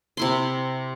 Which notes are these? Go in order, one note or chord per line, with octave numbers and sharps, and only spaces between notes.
C3 E4 C6